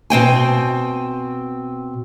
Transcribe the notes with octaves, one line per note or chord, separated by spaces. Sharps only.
B2 C4 G5 G#5